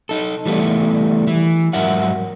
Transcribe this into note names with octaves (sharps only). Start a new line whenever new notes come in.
D#4 A4
E3 G3 A3 B3
E3
G#2 F#3 A#4 E5 F#5